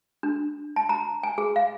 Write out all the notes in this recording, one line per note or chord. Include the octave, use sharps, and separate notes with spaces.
D4
A5
A#5
G#5
G#4
F5